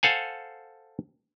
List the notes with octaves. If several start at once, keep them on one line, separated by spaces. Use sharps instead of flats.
A4 C5 F5 F#5 G#5